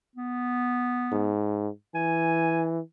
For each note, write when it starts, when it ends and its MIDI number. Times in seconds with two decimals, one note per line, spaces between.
0.16 1.34 59
1.12 1.69 44
1.95 2.80 52
1.95 2.65 80